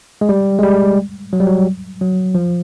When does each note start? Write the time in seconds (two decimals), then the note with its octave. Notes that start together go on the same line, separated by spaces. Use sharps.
0.21 G#3
0.29 G3
0.59 G#3
0.63 G3
1.33 F#3
1.40 G3
1.47 F#3
2.01 F#3
2.35 F3